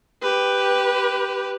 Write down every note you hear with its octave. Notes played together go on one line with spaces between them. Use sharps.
G4 B4